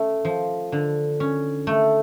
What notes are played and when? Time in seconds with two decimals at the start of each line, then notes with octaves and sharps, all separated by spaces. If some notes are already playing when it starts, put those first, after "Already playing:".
Already playing: A3 C#4
0.25 F3
0.72 D3
1.20 C#4
1.67 A3